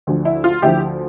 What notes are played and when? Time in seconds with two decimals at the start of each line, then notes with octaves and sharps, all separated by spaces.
0.07 D2 D3 F3
0.25 E4
0.44 F4
0.62 D2 D3 F3 E4 G4